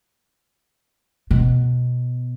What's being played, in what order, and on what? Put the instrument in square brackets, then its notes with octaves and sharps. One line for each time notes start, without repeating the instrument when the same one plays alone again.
[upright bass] B2